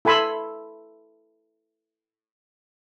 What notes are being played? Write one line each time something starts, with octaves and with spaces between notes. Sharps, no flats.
E4 A4 G#5 B5 C6 E6